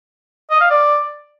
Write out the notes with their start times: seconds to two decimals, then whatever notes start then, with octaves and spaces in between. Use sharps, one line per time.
0.51 D#5
0.60 F5
0.70 D5